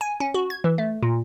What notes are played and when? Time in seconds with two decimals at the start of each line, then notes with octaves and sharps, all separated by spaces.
0.01 G#5
0.20 C#4
0.34 F#4
0.50 G#6
0.64 E3
0.78 A3
1.03 A#2